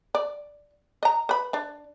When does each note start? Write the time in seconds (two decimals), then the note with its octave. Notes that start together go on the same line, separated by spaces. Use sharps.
0.15 D5
1.03 D#5 A#5
1.29 B4 B5
1.53 D4 D5